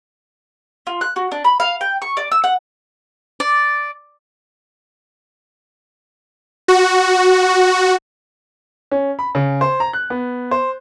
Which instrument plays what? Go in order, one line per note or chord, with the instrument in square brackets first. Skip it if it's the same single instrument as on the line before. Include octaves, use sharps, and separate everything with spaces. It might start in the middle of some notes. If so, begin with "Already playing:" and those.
[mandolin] F4
F#6
F#4
D4
B5
F5
G5
C#6
D5
E6
F#5
[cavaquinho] D5
[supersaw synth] F#4
[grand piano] C#4
B5
C#3
C5
A#5
F#6
B3
C5